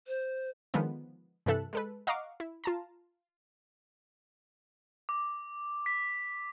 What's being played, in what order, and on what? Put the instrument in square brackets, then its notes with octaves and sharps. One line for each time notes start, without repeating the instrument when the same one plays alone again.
[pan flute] C5
[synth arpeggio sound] D3 D#3 F3 G#3 B3
G2 C3 E3 A4 E5 F#6
G#3 A4 B4
D#5 F5 F#5 A#5 C#6 D6
E4
F4 A5 A#5
[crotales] D6
B6